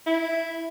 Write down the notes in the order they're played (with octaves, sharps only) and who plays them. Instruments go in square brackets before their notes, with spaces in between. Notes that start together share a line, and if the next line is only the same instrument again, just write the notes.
[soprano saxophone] E4